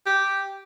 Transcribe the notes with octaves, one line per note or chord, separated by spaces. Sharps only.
G4